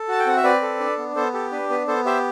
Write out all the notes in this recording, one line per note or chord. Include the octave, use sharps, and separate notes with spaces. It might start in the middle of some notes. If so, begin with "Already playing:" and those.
Already playing: A4
F#4 A5
G5
C4 F#5
E5
C4 B4 D5
A4
D4
B3
B3 A4 C5
G4 A4
D4 B4
B3 B4
B3 A4 C5
G4 C5 E5